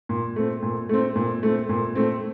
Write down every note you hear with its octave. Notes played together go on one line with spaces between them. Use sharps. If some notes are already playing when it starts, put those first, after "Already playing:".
A#2
A3 C4
A#2
A3 C4
A#2
A3 C4
A#2
A3 C4